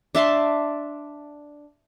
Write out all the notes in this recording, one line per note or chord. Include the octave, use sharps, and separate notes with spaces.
D4 E5 A5 C6